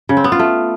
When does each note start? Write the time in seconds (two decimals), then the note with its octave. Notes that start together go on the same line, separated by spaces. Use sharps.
0.09 C#3
0.17 C4
0.24 B3
0.32 F4
0.39 A3